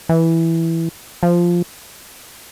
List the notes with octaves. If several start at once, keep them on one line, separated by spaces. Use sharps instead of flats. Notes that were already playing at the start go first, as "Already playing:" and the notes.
E3
F3